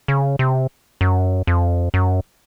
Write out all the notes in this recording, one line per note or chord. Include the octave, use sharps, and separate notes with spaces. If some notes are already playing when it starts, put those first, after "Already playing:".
C#3
C3
F#2
F2
F#2